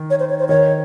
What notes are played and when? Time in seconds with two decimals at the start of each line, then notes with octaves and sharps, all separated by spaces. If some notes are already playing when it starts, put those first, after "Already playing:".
Already playing: D#3
0.10 C#5
0.20 C5
0.29 C#5
0.39 C5
0.48 D#3 C#5